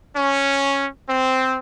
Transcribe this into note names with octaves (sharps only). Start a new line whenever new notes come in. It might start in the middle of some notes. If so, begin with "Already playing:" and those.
C#4
C4